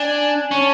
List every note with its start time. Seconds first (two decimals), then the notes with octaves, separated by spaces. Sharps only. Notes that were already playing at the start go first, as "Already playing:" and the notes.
Already playing: D4 G#5
0.51 C#4 A5